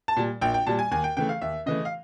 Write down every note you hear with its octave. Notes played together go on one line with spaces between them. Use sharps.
A5
A#2 G3
A#1 G5
G5
A#2 G3 A5
G#5
D#2 G#5
G5
C#3 E3 A3 G5
F5
D#2 E5
C#3 E3 A3 D#5
F5